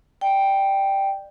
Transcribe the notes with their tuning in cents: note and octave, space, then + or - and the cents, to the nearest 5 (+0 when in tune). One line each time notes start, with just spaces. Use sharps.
D5 +30 G5 +0